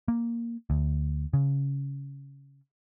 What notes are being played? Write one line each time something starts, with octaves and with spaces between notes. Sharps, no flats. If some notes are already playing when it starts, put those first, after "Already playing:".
A#3
D2
C#3